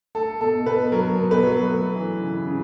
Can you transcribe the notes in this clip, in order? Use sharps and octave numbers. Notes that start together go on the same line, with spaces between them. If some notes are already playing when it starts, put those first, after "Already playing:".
A3 A4
B2 A4
B2 B4
F#3 A#4
B2
B4
F#3
A3
E3
C#3
C#3